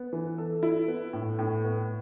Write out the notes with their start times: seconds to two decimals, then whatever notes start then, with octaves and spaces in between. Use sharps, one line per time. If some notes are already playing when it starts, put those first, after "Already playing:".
Already playing: B3
0.13 E3
0.38 A4
0.63 E4
0.88 B3
1.13 A2
1.39 A2
1.64 B3